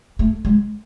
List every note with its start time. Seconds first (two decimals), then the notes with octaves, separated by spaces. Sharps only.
0.19 A3
0.45 G#3